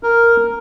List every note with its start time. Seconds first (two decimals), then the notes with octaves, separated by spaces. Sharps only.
0.03 A#4